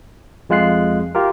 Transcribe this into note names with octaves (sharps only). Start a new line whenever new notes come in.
F2 G#3 F4 F#6 C7
F4 G4 A#4